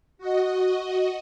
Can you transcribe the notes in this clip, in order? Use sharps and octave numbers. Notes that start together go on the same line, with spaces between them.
F#4 D#5